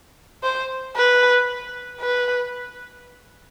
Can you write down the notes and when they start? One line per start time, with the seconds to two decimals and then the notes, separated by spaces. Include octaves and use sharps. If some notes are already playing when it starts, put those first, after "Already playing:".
0.43 C5
0.96 B4
2.01 B4